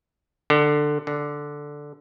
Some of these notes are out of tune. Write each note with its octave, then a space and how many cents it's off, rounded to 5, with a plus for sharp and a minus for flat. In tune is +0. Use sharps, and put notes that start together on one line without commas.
D3 +15
D3 +0